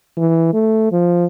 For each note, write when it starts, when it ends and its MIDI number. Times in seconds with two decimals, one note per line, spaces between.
0.17 0.50 52
0.53 0.91 57
0.92 1.25 53